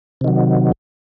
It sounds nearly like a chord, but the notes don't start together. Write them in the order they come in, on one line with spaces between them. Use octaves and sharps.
C3 D#3 F#3